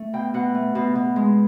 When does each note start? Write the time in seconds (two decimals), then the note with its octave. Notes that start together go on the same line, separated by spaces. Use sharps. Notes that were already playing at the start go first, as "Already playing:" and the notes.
Already playing: A3
0.13 B2 G5
0.34 B2 F#5
0.55 A3
0.75 B2
0.95 B2
1.16 G#3